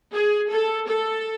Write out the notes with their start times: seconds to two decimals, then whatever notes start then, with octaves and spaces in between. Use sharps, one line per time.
0.12 G#4
0.50 A4
0.88 A4